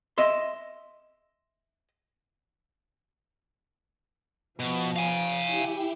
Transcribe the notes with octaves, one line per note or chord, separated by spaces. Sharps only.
D#5 E5 C6
B2 F3
F5 G#5
E4 G4